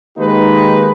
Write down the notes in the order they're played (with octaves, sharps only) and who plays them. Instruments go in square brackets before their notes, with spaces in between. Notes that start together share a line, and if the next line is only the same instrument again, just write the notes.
[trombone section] D#3 G#3 A#3 D#4 G4 B4